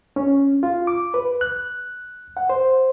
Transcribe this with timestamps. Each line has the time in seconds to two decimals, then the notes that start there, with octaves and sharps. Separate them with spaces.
0.16 C#4
0.63 F4
0.87 D6
1.14 B4
1.41 F#6
2.37 F#5
2.50 C5